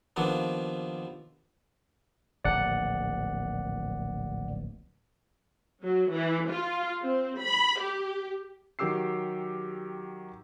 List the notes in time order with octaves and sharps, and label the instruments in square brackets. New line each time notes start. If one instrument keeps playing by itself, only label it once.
[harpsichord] D#2 F3 B3 D4
[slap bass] D1 A#1 D#3 [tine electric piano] D5 F#5
[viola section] F#3
E3
F4
C4
B5
G4
[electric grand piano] D#3 F#3 G4 D6 E6 C7